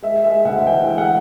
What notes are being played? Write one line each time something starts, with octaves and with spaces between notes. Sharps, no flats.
G#3 E5
G#3 E5
D2 F#5
E3 G5
G#3
F#5